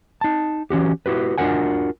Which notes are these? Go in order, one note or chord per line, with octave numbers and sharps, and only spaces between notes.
D#4 A5
E3 C#4 F#4 G4
E4 F#4 G4 B4
D4 F4 F#4 A#4 F#5 G#5